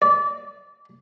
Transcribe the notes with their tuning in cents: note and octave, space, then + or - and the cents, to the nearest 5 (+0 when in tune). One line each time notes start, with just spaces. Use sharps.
D5 -25